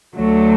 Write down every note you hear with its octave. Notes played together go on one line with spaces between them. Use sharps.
D2 D3 F#3 A3